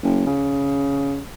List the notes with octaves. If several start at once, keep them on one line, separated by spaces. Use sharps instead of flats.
F#1
C#3